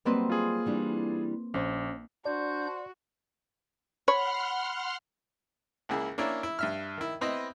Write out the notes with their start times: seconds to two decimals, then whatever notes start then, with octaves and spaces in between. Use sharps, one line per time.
0.05 F#3 G3 A#3 C4 B4 D#5
0.30 F4 G#4
0.66 E3 G3 D4
1.54 A#1 C#4 C5
2.25 D4 F#4 C5 D5 G6
4.08 C#5 F#5 B5 C6 F6
5.89 C#2 A#3 E4 G#4
6.18 A#3 C#4 D4 E4 A#4
6.43 E4
6.59 G2 E5 F6
6.98 D#3 E4
7.21 B3 C4 E4 D#5